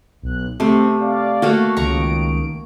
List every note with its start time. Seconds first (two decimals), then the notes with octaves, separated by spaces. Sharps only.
0.22 B1 F#6
0.60 C3 A3 C4
1.00 D5 F5
1.42 A3 A#3 F#4
1.77 C#2 D#3 A#5 C#6 D7